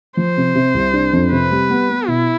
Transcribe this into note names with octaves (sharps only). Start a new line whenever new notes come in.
F3 C5
C3
C3
C2
D4
F2
C3 B4
G3
B3
B3
B2 E4